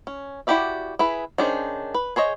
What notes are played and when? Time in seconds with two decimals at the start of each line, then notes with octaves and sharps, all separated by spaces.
0.07 C#4
0.47 E4 F#4 G4 D5 E5
0.99 E4 G#4 B4
1.38 D#3 C#4 D4 G#4 C5
1.94 B4
2.16 G#4 C5 C#5 D#5